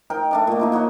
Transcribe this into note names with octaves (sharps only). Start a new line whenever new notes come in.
D#4 A#4 G5
A3 D4 D#5
A#2 A#3
D#4 E4 F#4
D#4 F#4 C#5 D#5